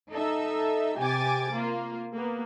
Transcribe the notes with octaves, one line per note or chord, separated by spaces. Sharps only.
D#4 A4 E5
C3 G4 G#5 D6 A6
A#3 F4
A#3 B3